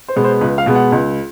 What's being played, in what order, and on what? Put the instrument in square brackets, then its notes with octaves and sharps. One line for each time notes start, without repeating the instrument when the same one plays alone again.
[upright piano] C5
B2 G#3 B3
C5
C#2 B4
F5
B2 G#3 B3
F#5
C#2